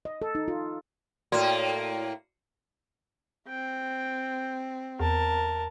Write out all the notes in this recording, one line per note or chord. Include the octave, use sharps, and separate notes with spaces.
D#5
A4
D#4
F4
A2 A#3 F#4 D5 C6
C4 G5
E2 A#4 A5